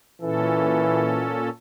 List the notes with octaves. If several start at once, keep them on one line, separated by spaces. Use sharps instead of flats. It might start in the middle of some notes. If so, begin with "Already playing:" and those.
A#2 E3 C#4 A4